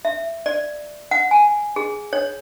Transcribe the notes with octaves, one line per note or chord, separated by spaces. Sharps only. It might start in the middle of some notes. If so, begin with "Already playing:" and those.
E5
D5
F#5
G#5
G#4
C#5